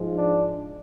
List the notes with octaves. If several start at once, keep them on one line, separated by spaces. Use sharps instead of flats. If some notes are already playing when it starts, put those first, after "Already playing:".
Already playing: G#2 F3 G#3
D4